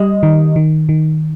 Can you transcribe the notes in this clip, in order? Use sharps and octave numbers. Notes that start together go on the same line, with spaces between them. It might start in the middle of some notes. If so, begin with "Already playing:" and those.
Already playing: G3 D#5
D#3
D#3
D#3